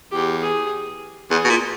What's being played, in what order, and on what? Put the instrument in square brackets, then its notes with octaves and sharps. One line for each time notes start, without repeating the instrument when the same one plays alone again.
[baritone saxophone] E2 [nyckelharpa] G4
[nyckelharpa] G#4
[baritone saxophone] E2 [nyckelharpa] G#4
[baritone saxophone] B2
A#2